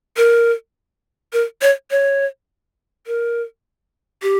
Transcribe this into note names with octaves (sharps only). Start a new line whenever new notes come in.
A#4
A#4
C#5
C#5
A#4
G4